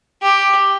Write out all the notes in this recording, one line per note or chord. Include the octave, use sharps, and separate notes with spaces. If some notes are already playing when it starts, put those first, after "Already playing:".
G4